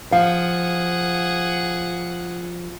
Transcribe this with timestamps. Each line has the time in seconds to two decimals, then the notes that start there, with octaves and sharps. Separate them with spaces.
0.12 F3 G#4 F5 F#5